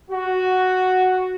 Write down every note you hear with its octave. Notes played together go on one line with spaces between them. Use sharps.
F#4